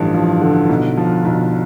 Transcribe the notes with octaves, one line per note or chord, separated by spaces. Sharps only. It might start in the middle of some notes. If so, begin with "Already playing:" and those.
Already playing: A1 G2 D3 F3
F3
D3
B1
F3
B1